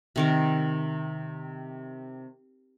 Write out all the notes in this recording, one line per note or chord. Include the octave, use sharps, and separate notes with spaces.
C3 D#3 A#4